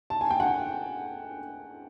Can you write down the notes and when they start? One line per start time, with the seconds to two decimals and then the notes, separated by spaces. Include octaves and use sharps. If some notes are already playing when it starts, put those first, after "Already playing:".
0.10 A5
0.21 G#5
0.30 G5
0.40 F#5 G#5